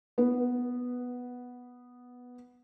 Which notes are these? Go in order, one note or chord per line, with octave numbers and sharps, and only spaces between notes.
B3 B4